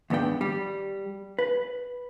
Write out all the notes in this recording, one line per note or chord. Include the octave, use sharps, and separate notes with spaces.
D#2 G#2 B3 D4 G5
G3
B4